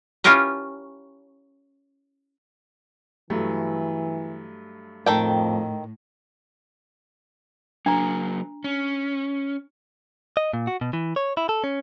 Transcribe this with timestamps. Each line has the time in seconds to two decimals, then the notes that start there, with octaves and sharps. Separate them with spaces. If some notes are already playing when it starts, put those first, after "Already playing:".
0.24 C#4 E4 F4 G4 A#4 B4
3.30 G2 E3 F#3 A3
5.06 F2 A2 D#3 A4 G5
7.86 F#3 A#3 D4 A#5
8.64 C#4
10.37 D#5
10.53 A#2
10.67 F#4
10.81 B2
10.93 E3
11.16 C#5
11.37 E4
11.49 A4
11.64 C#4